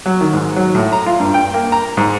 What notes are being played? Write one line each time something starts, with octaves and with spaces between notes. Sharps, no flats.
F#3
D#3
G#2
F#3
A2
A#5
F4
G2
G5
A#3
A#5
G#2